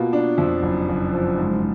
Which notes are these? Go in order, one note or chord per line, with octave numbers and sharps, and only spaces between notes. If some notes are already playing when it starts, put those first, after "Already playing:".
Already playing: B2 A#3 F4
D4
F2
F#1
F#1
F3
G#2